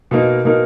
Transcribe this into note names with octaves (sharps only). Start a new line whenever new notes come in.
B2 A#3 D#4 A#4
B2 A#3 D#4 A#4